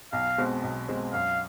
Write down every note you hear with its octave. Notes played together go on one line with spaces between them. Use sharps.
B1 F5
B2 G#3 C4
B1
B2 G#3 C4
F#2 F5